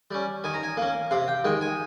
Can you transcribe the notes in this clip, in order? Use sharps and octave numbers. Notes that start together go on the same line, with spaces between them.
G3 C#4
D#3 G#5
A#5
G#5
A#3 C#4
C3 F5
G5
D#3 G#3 G5
G#5